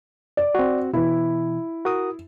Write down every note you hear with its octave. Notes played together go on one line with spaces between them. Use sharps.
D5
C4 F#4
B2 E3 E4
F#4 A#4 D#6